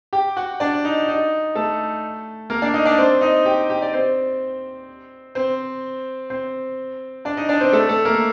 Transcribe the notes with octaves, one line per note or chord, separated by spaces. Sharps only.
G4 G5
F#4 F#5
D4 D5
D#4
D#4
A3 A4
A#3 A#4
D4 D5
D#4 D#5
D4 D5
C4 C5
D#4 D#5
G4 G5
G4 G5
D5
C4 C5
C4 C5
C4 C5
D4 D5
D#4 D#5
D4 D5
C4 C5
A3 A4
A3 A4
A#3 A#4